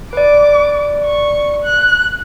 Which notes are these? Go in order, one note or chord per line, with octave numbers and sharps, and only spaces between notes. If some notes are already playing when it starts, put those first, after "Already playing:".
B4 D5 D6
C#6
F#6